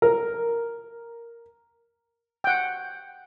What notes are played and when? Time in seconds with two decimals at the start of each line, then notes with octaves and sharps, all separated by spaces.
0.02 A#4
2.44 F#5 G5